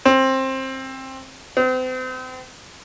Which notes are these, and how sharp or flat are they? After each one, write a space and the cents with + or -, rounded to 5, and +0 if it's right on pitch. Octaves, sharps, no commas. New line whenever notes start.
C4 +20
C4 -35